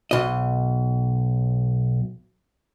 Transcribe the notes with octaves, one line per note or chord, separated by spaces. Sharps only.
B1 D#5